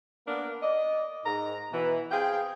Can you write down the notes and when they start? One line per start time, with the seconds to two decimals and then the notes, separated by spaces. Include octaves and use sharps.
0.27 A#3 B3 D4 A#4
0.62 D5 D#5
1.25 G#2 A#5
1.72 B2 E3
2.12 C4 G#4 F5 G5